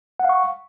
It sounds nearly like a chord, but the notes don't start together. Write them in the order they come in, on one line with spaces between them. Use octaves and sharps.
F#5 F5 C#6